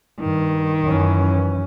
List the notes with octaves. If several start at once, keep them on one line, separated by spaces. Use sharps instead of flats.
G2 D#3
F#2 E3 C#4